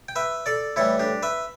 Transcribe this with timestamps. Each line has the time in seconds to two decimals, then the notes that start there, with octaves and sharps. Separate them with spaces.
0.09 G5
0.16 B4 E5
0.46 A4 D5
0.76 A2 E3 G3 E4 A4
0.99 D4 G4
1.23 B4 E5